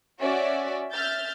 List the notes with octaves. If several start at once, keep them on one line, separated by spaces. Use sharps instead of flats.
C#4 F#4 D5 E5
E5 F6 G6 A6